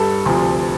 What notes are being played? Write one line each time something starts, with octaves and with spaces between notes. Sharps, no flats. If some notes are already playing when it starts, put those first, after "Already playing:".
Already playing: G2 G3 A4
D2 C3 F3